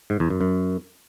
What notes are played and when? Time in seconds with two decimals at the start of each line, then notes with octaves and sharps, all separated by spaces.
0.10 G#2
0.20 E2
0.30 F#2
0.41 F#2